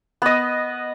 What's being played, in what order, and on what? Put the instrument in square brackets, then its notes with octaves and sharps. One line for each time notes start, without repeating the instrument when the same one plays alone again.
[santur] B3 D#5